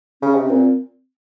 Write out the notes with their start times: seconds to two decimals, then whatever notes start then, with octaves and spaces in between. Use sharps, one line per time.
0.22 C#3 C#4
0.35 C3
0.44 C#4
0.50 A#2 C4